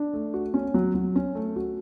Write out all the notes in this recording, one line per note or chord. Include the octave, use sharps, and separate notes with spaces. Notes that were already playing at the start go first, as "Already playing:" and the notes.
Already playing: D4
A3
F#4
C#4
F#3
F#3
C#4
A3
F#4